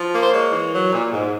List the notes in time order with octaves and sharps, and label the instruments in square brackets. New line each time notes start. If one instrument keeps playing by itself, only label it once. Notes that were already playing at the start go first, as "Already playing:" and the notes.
Already playing: [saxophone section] F3
A#3
C5
G#3 C#5
E3
F#3
A#2
G#2